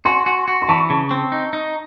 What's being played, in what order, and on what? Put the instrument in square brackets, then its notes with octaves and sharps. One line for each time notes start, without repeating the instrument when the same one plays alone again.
[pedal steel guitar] F#4 [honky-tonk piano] G#5 C6
[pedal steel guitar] F#4
F#4
[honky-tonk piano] C6
[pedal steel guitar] E3 [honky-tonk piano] A5 C#6
[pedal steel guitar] C#3
C4
D#4
D#4